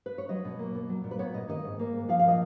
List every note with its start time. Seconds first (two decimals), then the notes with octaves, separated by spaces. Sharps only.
0.06 B4
0.18 C#5
0.29 F#3 D#5
0.45 B2
0.59 A#3
0.75 B2
0.89 F#3
1.04 A#2
1.11 B4
1.19 B3 C#5
1.34 A#2 D#5
1.49 D#3 D#5
1.64 G#2
1.79 A#3
1.93 G#2
2.09 F3 F5
2.19 F5
2.24 A#2 D#5